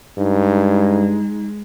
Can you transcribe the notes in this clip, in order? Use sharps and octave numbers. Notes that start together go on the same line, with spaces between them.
G2 G#3 D#4